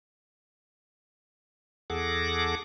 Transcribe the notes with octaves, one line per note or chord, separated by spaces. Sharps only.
E2 G#4 A4 F#5 D6 A#6